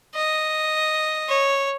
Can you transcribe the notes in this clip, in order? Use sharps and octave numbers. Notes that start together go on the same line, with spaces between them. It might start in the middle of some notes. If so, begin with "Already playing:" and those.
D#5
C#5